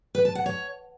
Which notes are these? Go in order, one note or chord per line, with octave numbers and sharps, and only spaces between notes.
B4
A5
F#5
C#5